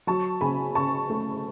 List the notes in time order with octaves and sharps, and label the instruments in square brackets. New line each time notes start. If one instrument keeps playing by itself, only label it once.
[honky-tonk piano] F#3 A5 C#6
C#3 G#5 B5
C#3 A5 C#6
A3